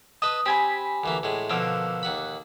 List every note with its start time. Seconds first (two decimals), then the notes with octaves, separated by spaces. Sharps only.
0.22 B4 D#5 A5 D#6
0.46 C4 G4 G#5 B5
1.04 D2 E3 A#3
1.23 A2 G#3
1.50 B2 D3 F3 A#3 E6
2.03 D#2 F#4 B5